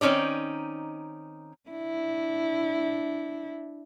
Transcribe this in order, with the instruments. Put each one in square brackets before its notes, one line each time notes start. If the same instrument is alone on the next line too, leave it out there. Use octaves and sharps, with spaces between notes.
[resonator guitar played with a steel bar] D#3 C4 C#4 D#4 D5
[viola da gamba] D4 E4